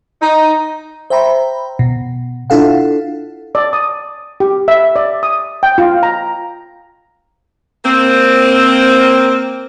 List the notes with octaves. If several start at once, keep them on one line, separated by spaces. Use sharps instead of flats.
D#4
C5 E5 G5 A#5 B5
B2
D4 E4 F4 A4 F5 F#5
D5
D#6
G4
E5
D5
D#6
G5
F4
A#5
A#3 C4